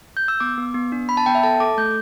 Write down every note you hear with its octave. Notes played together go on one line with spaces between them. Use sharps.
G6
E6
B3 D6
B3
B3
D4
B3 B5
A5
B3 G5
E5
A4 A5
A4 D6
A3 G6